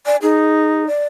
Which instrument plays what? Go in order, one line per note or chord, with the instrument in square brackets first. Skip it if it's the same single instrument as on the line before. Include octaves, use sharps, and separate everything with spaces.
[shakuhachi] D5 [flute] G#5
[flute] D#4 [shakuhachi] G#4
[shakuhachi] D5